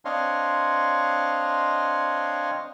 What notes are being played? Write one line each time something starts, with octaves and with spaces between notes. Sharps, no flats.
C4 D4 C#5 D#5 F5 C6